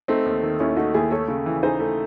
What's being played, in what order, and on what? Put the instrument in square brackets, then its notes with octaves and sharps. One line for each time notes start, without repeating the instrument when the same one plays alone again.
[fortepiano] A3 [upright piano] C4 D#4
[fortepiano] D#2
D#3
[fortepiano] D#2 [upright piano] C#4 E4
[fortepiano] A3 [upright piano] D#4 F#4
[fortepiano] D#2 [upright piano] E4 G#4
[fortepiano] A3 [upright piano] A4 C#5
[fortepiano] C#3
E3
[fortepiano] D#4 [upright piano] G#4 C5
[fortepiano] A3